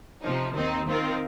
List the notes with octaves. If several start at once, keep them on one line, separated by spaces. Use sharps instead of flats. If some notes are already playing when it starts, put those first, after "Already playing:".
C3 F3 D#4
D#2 D#3 C4 D#4
D#3 C4 F4 A#4